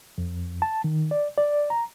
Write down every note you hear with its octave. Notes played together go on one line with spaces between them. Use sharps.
F2
A5
D#3
D5
D5
A#5